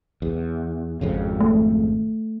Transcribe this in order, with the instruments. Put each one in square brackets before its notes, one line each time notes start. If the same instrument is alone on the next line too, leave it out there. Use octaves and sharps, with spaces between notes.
[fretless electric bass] E2
G#1 F2 C#3
[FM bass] A3